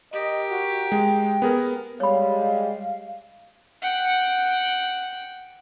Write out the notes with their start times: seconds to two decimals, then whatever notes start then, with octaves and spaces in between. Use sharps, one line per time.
0.13 G4 A#4 D#5
0.51 F#4
0.92 G#3 G5
1.42 B3 G#4 A#4
2.00 G3 G#3 C#5 F5 B5
3.82 F#5 G5